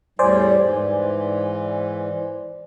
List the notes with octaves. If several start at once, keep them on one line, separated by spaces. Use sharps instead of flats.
E2 A2 G3 C5 D5 G#5
G#2 E3